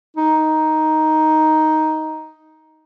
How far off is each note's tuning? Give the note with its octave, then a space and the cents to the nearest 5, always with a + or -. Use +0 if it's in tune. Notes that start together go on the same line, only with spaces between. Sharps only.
D#4 +5